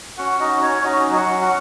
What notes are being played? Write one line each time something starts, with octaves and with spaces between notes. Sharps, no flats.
C#4 F#4 F#5
D#4 F#4 D#5
C#4 C#5
D#4 F#4 D#5
F#3
D#5
F#4 F#5
C#4
F#5